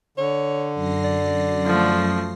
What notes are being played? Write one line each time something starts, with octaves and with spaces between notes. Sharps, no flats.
D3 C#5
F#2 A#6 C7
D5
F3 A3